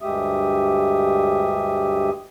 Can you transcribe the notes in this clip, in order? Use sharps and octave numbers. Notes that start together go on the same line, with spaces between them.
D2 G2 G#3 G4 E5 D#6